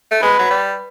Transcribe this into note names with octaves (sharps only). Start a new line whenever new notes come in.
A3
G#3 B4
F#3
G3